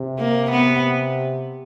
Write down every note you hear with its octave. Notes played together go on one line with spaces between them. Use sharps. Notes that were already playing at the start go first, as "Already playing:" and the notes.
Already playing: C3
A#3
B3